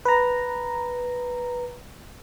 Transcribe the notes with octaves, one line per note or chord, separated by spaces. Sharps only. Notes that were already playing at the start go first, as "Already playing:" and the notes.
B4 A#5